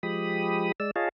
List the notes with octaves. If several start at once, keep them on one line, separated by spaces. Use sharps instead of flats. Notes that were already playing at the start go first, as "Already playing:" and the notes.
F3 G#3 G4 B5 D#6
G#3 D5 E6
F4 G#4 C#5 D#5 F5 A5